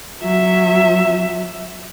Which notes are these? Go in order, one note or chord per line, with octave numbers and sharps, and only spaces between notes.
F#3 E5